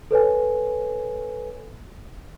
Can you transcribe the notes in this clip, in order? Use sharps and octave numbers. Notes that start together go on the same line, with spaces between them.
A4 B4 C#5 G#5